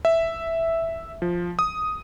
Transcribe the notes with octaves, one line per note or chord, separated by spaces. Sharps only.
E5
F3
D#6